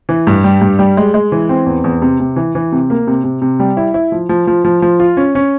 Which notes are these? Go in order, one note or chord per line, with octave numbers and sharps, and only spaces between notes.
E3
G2
G3
G2
G3
G#3
G#3
E3
C4
E2
E2
C3
C3
E3
E3
C3
A#3
C3
C3
C3
G3
E4
E4
F3
F3
F3
F3
F3
F4
C#4
C#4